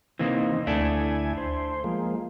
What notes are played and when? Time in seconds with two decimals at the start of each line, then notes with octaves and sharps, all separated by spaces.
0.19 C3 E3 A#3 C4 D#4
0.67 D2 A3 D4 E4 G#5
1.37 C5
1.84 F3 G#3 A#3